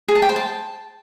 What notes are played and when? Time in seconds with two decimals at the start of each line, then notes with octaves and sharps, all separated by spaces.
0.08 G#4
0.15 A5
0.22 G5
0.29 C5
0.36 A5